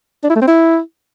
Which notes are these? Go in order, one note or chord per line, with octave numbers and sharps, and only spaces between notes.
D4
E4
A3
C4
E4